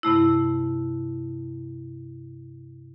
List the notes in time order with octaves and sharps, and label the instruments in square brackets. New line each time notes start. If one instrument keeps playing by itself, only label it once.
[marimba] G2 C3 A3 E4